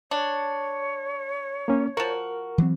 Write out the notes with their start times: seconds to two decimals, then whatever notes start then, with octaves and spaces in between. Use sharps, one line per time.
0.11 D4 C#5
1.68 A#3 C#4
1.97 F3 F#4 A#4
2.58 E3 F#3 C4